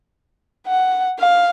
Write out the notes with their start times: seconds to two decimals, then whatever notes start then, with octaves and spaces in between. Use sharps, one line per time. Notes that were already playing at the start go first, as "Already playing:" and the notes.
0.67 F#5
1.19 F5